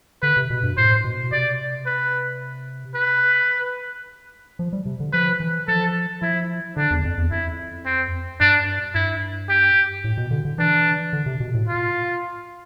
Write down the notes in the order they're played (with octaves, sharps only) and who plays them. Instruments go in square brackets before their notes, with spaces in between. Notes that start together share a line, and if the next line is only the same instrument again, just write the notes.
[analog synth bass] D3 [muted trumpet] B4
[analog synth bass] C3
B2
G2
[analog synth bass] A2 [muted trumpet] C5
[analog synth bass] B2
[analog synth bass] C3 [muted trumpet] D5
[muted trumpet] B4
B4
[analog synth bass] F3
G3
C3
D3
[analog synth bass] F3 [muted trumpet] B4
[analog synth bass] E3
[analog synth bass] F3 [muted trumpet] A4
[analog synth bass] F3 [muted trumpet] E4
[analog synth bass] D3 [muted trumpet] D4
[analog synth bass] E2
F2
E2
[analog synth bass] F2 [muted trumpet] E4
[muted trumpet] C4
[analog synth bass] G2 [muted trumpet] D4
[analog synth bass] G2 [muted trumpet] E4
[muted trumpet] G4
[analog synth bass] A2
B2
D3
D3
[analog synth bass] E3 [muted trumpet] D4
[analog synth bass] D3
C3
B2
A2
[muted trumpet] F4